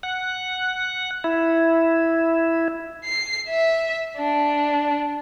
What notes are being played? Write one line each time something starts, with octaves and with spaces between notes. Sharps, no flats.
F#5
E4
C7
E5
D4